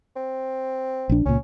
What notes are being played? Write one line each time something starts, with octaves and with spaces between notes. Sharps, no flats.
C4
A#1 D4
C#2 A#2 C#4